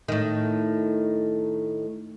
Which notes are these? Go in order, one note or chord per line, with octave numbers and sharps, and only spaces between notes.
A2 D#3